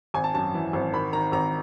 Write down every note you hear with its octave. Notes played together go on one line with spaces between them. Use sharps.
G#1 G#5
A5
F#2 A5
E3
G#1
D#3 B5
D#3 A#5
G#1 A#5